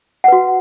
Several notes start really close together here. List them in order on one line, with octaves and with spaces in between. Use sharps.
F#5 B4 F#4